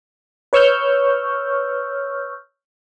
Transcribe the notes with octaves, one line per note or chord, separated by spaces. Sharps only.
B4 C#5 C#6 E6 F6 G6